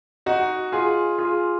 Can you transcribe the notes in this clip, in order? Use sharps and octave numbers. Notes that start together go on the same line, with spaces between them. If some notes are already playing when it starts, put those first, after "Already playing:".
D#4 F#4
F4 G#4
F4 G#4